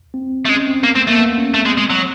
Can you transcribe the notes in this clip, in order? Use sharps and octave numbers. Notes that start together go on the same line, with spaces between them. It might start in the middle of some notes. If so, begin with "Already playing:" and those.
C4
A3
G#3 C#4
C4
A#3 B3
A3 C4
A3 A#3
B3
C#4
A3 C4
G#3
G#3
F#3